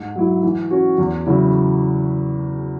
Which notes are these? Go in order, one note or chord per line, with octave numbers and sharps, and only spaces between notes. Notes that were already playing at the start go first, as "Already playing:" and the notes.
Already playing: G#2
F#3 E4
E3
C#4 F#4
E2
C#3 F#3 E4